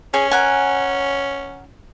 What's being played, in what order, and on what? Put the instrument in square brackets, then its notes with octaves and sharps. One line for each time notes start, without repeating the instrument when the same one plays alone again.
[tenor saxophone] C#4 [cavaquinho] G#4
[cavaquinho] A#4 F#5 G#5